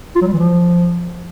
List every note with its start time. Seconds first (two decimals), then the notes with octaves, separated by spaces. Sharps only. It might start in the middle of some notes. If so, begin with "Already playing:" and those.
0.16 F4
0.22 F#3
0.27 G3
0.33 E3
0.39 F3